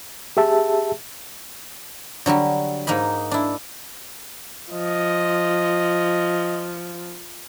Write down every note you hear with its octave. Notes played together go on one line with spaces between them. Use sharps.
G4 G#4 E5 A5
D3 F#3 G3 F#4
G#2 A#3 D#4 D#5 B5
D4 E4
F3 D#5